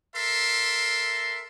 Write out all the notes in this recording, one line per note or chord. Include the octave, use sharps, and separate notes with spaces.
A4 A#4 E5 C6